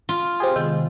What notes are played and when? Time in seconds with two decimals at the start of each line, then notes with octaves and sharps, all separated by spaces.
0.09 F4
0.40 C4 G4 G#4
0.56 C3 D#3 G#3 B3